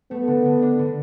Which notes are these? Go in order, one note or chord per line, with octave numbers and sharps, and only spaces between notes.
A3 B3
D3
D3
D4
D3